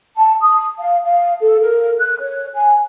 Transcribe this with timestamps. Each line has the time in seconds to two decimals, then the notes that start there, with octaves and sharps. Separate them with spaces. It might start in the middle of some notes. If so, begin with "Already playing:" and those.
0.17 A5
0.41 D#6
0.79 F5
1.05 F5
1.41 A4
1.61 A#4
1.99 F#6
2.22 C#5
2.54 G#5